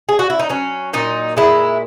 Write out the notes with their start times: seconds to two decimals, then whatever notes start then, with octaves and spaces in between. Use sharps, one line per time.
0.09 G#4
0.19 F#4
0.30 E4
0.39 D#4
0.49 F#3 C#4
0.93 A#2 D#4
1.37 G#3 E4